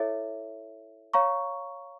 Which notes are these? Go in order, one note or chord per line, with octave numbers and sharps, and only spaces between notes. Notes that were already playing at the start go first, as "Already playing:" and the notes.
Already playing: E4 A4 C#5 E5
C#5 F5 A#5 C#6